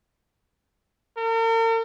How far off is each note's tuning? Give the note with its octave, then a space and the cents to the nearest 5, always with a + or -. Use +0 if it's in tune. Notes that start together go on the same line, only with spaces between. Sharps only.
A#4 -45